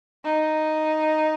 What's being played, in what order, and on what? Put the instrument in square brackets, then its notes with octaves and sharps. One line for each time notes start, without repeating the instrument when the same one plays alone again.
[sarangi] D#4